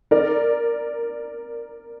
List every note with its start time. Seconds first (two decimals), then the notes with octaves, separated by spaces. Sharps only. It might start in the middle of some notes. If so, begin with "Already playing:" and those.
0.11 A#4 D5